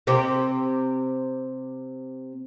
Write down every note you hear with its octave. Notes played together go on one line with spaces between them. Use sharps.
C3 C4 G4